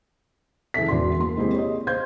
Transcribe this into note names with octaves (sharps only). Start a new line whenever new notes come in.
F#1 E3 G#4 A4 E5 B6
E1 F#4 D5 C6
A#3 C6
G#3 A#3 C4 E4 G4 G#4
C#5 D#5
C5 F5 C6 G6 G#6